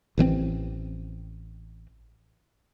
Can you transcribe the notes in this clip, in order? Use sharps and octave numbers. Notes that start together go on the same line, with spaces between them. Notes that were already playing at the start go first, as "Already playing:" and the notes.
A1 E3 G#3 C4